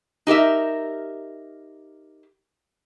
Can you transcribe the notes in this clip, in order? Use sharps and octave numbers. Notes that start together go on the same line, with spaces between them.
D#4 G4 A#4 E5